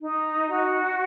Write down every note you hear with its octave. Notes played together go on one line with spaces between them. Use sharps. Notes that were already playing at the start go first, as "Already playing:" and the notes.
D#4
F#4